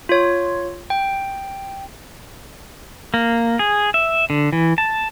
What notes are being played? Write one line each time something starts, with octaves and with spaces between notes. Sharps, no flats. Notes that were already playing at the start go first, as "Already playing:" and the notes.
F4 C#5
G5
A#3
G#4
E5
D3
E3
A5